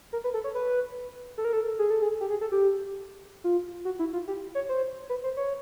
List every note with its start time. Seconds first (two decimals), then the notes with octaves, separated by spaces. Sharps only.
0.13 A#4
0.24 B4
0.34 A4
0.44 C#5
0.55 B4
1.38 A4
1.45 A#4
1.53 A4
1.79 G#4
1.90 A4
2.02 G#4
2.20 G4
2.30 G#4
2.41 A4
2.52 G4
3.44 F4
3.85 F#4
3.99 E4
4.13 F4
4.28 G4
4.55 C#5
4.69 C5
5.09 B4
5.24 C5
5.37 C#5